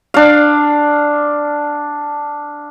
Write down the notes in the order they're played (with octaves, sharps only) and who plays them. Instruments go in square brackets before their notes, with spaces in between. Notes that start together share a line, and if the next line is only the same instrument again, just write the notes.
[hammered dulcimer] D4 F5